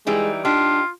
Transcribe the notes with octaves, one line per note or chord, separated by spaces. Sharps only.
E3 G3 G#3 D#4
D4 D#4 F4 G4